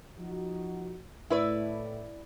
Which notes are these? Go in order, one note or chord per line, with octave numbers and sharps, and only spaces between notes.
F3 D#4 F#4
A2 E4 B4 D5